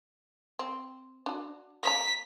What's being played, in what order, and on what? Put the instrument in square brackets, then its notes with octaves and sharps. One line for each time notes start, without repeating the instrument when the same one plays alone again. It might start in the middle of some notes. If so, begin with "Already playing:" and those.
[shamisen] C4
D4 F#4
[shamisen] A#3 C#5 A#5 [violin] B6